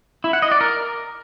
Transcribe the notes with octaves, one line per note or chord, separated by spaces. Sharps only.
E4
F#5
D#5
D5
A#4